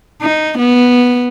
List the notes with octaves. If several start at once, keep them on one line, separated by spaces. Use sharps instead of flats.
D#4
B3